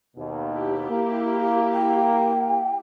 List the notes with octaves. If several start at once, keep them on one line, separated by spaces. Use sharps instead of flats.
D#2 B2
E4 G4
A#3
G5